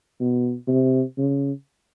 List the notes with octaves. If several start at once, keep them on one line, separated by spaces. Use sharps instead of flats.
B2
C3
C#3